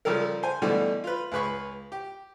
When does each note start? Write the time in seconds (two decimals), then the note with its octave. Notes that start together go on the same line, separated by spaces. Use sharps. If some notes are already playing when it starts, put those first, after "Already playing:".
0.05 C#3 F3 G3 A4 A#4
0.43 C5 G#5
0.62 B2 D3 E3 G3 A3
1.04 F4 B4
1.32 C#2 G#4 B4 B5 C#6
1.92 G4